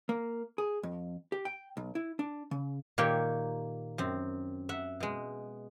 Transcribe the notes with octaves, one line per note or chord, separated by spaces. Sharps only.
A#3
G#4
F2
G4
G5
B1
E4
D4
C#3
A#2 D#3 A#3 G4 C#5 G5
F#2 C4
E5 F#5
B2 G#3